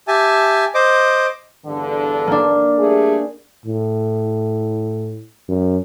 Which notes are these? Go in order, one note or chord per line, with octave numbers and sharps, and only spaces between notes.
G4 E5 G#5 A5
C5 D#5 D6
E2 G2 D3
A#3 D4
G3 A3 G#4
A2
F#2